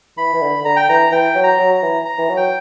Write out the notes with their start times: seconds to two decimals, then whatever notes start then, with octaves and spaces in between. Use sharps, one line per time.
0.17 E3 B5
0.34 E3
0.41 D3
0.65 D3 A#5
0.76 G5
0.89 E3 A#5
1.12 E3 G5
1.35 F#3
1.44 A#5
1.59 F#3
1.75 A#5
1.82 E3
2.05 A#5
2.18 E3
2.29 F#3
2.37 G5